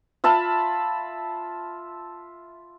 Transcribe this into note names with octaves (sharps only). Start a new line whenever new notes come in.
F4 E5 A5 B5